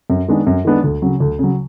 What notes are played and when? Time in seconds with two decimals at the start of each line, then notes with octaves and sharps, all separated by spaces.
0.10 F#2
0.28 D#3 G#3 B3 D4
0.47 F#2
0.65 D#3 G#3 B3 D4
0.84 D2
1.02 C#3 F#3
1.20 D2
1.39 C#3 F#3